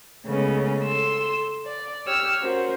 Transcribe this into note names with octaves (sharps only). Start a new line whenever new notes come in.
C#3 G#3 A3 B3 C#4
A4 C6 E6
D5
G4 C#5 E6 F6
C#4 F#4 A#4 C5